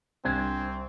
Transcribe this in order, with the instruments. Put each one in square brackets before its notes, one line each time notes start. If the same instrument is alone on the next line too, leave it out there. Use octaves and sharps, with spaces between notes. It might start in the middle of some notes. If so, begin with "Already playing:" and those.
[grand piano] C2 [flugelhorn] C4 [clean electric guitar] D4 C5 G#5